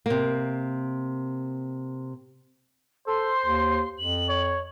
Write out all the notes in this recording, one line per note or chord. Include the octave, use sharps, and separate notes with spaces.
C3 A#3
A4 C5 C6
D#2
F2 F#7
C#5